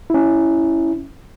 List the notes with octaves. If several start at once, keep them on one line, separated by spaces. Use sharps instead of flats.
C#4 E4